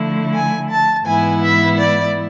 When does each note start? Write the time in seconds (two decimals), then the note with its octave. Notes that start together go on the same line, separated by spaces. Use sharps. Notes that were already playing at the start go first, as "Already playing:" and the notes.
Already playing: D3 F3 A3 E4
0.33 G#5
0.69 A5
1.05 G#2 E3 B3 E4 G#5
1.42 E5
1.78 D5